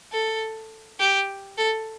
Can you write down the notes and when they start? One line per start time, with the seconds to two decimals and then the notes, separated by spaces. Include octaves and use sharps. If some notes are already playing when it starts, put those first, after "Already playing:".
0.12 A4
0.99 G4
1.58 A4